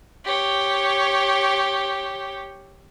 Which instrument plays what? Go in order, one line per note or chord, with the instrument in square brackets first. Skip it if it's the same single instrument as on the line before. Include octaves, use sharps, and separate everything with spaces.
[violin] G4 C#5